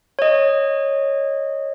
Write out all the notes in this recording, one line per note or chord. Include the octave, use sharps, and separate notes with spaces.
C#5 D#5